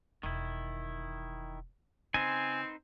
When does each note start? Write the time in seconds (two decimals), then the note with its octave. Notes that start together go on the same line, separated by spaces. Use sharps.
0.23 E1 D#3 E4
2.14 C#3 C4 D#4 B4 C5 G#5